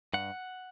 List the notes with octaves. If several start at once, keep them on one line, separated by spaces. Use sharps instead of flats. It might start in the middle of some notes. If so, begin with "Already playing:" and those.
G2 F#5